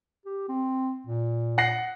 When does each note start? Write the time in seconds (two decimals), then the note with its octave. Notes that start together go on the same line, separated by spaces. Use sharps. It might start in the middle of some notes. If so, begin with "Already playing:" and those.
0.26 G4
0.49 C4
1.07 A#2
1.58 F#5 A#6 C7